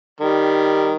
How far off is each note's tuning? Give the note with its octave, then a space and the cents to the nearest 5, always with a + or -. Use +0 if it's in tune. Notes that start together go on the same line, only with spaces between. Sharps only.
D#3 -5 G3 +0